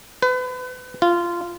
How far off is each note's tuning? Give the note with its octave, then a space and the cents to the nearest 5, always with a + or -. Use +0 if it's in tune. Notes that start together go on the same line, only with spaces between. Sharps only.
B4 +35
F4 -15